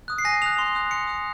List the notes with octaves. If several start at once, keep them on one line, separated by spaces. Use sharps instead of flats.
D#6 F#6
C7
G#5 A#6
D#6 F#6 F7
C6
D#6 F#6
C6 C#7
D#6 F#6